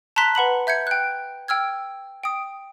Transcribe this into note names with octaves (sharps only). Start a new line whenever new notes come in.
A5 A#5 C6 F#6 B6
B4 F#5 B5 F#7
E5 G6 G#6 C#7
G5 F#6
G5 E6 F6 G#6
G5 D#6